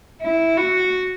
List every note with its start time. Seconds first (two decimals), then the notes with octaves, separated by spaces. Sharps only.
0.22 E4
0.57 F#4